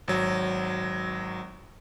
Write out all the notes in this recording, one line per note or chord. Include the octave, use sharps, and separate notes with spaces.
G#1 F#3